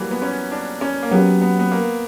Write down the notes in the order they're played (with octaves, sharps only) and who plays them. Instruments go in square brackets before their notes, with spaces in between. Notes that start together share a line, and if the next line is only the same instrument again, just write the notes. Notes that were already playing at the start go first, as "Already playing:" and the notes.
Already playing: [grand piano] E3 F#3 G3 A#3
B3
C#4
D4
C#4
A#3
[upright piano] F#3 C#4 G4 [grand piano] B3
[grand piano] B3
B3
A#3